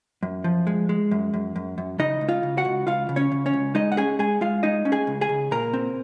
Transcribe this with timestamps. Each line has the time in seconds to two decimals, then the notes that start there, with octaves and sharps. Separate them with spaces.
0.23 F#2
0.44 F3
0.67 G#3
0.89 G#3
1.11 F#2
1.34 F#2
1.56 F#2
1.78 F#2
1.99 C#3 D#4 D#5
2.21 C#2
2.29 F4 F5
2.43 C#3
2.58 F#4 F#5
2.65 C#2
2.87 C#2 F4 F5
3.09 C#3
3.16 C#4 C#5
3.32 C#3
3.46 C#4 C#5
3.53 C#2
3.75 G#3 D#4 D#5
3.92 F#5
3.97 C#4 G#4 G#5
4.19 G#3 G#4 G#5
4.41 G#3 F4 F5
4.63 G#3 D#4 D#5
4.85 C#4
4.92 G#4 G#5
5.07 C#2
5.21 G#4 G#5
5.29 C#3
5.51 A#2 A#4 A#5
5.73 C4